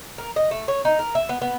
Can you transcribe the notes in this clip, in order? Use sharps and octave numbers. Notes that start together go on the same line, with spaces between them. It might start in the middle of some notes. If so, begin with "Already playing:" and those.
A#4
D#5
A3
C#5
D#4
A#4
E5
B3
B3